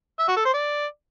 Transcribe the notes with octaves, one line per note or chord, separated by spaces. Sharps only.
E5
F#4
A4
C5
D5